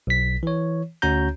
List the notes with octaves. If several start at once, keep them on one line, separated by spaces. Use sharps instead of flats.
B1 B6
E3 C#5
D2 C#4 F#4 C#5 A#5 G6